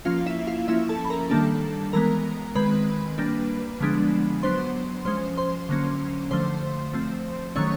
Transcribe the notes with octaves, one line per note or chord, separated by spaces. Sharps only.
F3 A#3 C#4 F4 F5
E4 E5
F4 F5
F3 A#3 C#4 E4 E5
A4 A5
B5
A#4 A#5
D#3 G3 A#3 D4 A4 A5
E3 G#3 B3 A#4 A#5
D#3 G#3 C4 B4 B5
G3 A#3 D4
D3 F3 G#3 B3 D4
F#3 B3 D4 C5 C6
F3 G#3 C#4 C5 C6
C5 C6
D3 F#3 A#3 C#4
D3 F3 A3 C5 C6
F3 A3 C4
D#3 F#3 A3 C#4 C#5 C#6